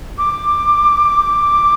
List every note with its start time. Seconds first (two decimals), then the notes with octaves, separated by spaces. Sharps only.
0.18 D6